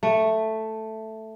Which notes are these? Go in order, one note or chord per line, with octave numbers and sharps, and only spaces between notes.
A3